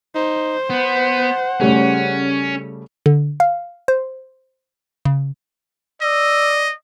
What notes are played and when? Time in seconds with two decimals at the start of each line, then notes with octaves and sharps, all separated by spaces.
0.15 D#4 C5
0.70 B3 F#5
1.60 C#3 G3 A3 C#4
3.06 D3
3.40 F5
3.88 C5
5.05 C#3
6.02 D5 D#5 E6